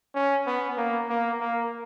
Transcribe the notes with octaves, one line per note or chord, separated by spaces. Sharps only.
C#4
B3
A#3
A#3
A#3